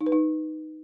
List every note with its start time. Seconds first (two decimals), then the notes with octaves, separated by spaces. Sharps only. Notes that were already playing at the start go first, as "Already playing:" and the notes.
0.01 D#4
0.06 B4
0.12 D#4